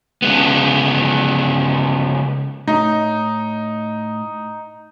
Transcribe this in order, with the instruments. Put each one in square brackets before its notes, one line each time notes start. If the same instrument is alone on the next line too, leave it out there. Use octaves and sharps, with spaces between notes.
[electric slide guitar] C#3 G#3 B3
[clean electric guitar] A2 [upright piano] D#4